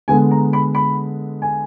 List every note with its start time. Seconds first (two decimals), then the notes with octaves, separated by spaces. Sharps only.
0.08 D3 G#3 B3 G#5
0.31 A#5
0.53 B5
0.75 B5
1.42 G#5